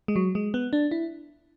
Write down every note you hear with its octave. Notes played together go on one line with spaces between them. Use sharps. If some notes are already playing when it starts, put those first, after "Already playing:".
G#3
F#3
G#3
B3
D4
E4